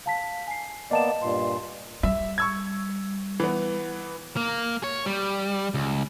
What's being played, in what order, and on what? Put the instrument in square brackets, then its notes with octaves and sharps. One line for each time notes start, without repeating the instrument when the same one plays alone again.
[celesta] F5 A5 B6
G#5 C7
[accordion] A#3 B3 D5 [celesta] D#5 A5 E7
[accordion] G2 A#2 C6
[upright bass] G3 [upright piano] E5
[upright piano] C#6 E6 G#6
E3 B3
[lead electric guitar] A#3
C#5
G3
C#2